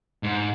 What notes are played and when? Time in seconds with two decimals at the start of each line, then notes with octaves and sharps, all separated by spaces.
0.23 G#2